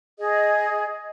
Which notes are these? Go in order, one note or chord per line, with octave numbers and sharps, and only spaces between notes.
G#4 D#5